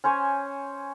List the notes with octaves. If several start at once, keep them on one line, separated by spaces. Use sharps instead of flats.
C#4 C5 C#5 G#5